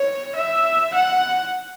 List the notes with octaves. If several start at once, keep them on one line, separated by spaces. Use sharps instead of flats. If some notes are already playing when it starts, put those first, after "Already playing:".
Already playing: C#5
E5
F#5